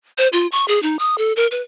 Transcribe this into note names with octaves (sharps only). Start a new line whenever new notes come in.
C5
F4
C#6
G#4
D#4
D#6
A4
A#4
B4